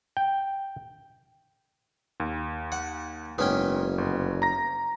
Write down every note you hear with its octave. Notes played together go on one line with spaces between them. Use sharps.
G5
D#2
F#5
F#1 G#2 B3 C#4 G5
G1
A#5 A#6